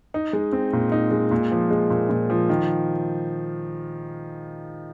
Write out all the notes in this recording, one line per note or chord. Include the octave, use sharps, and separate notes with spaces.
D#4
G#3
C4
A#2
D#4
G#3
A#2
F3
G#3
A#2
A#2
F3
D#3